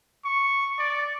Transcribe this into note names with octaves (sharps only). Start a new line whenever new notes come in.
C#6
D5